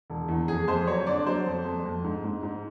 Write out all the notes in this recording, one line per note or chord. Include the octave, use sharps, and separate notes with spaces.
E1
E2
F2 G#4
F2 C5
F#3 C#5
D3 D5
F#3 C5
F2
F2
F2
G#2
G#2
G#2